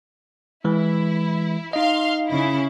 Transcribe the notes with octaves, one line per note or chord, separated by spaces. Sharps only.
E3 G#3 E4
D#4 D#5 F5 C6
C#3 E4